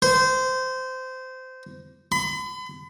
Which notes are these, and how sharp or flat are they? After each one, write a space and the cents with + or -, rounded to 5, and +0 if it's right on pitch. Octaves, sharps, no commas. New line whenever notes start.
C5 -20
B5 +40